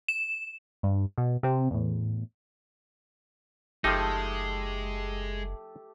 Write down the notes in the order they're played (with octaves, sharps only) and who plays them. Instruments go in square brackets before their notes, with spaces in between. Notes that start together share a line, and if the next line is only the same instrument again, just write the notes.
[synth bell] E7
[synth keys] G2
B2
C3 C4
E2 A2
[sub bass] F#1 [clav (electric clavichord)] F3 D#4 [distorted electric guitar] G#3 [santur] A3 G4 A5